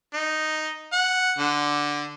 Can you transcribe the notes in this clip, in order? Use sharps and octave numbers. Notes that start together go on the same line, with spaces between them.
D#4
F#5
D3